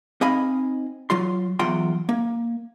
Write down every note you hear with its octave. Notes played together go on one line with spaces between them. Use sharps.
C4 D#4 D#5 F5 G#5 B5
F#3 F4 C6
E2 F#3 F4 F#5 G5 C6
A#3